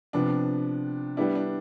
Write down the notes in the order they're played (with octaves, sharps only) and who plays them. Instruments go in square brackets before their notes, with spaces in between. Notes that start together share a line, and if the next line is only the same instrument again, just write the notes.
[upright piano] C3 F3 B3 [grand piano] D4
[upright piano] G3 B3 E4 [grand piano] D4
[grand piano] D4